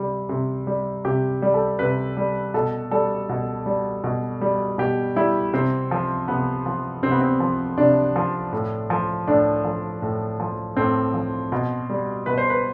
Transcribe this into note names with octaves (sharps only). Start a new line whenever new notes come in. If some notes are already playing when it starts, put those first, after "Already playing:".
Already playing: C3 G3
C3
G3
C3 G4
G3
A4
C3 B4
G3
B2 A4
G3 A4
B2
G3
B2
G3
B2 G4
G3 E4
C3 C4
F3
C3 B3
F3
C3 C4
B3
C4
F3
C3 D4
F3
A2
F3
A2 D4
F3
A2
F3
A2 C4
F3
B2
G3
B2 B4
C5
B4